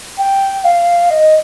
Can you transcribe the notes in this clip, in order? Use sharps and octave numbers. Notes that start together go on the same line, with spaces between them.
G5
F5
D#5